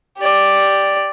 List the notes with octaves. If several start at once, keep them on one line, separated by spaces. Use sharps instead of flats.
G4 D5